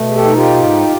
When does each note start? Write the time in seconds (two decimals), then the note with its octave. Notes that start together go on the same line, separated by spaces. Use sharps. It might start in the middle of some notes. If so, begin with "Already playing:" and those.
Already playing: B2 A3
0.09 G#4
0.15 G4 A4
0.25 D#4
0.35 F4 G4
0.56 G#2